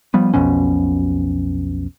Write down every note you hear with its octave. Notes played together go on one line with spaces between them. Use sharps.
F3 G3 B3
B1 F2 B2 C#4